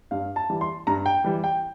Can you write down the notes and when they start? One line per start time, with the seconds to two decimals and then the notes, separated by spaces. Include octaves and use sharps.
0.11 G2 F5
0.36 A5
0.50 E3 G3
0.61 C6
0.87 G2 A#5
1.06 G5
1.24 E3 G3
1.44 G5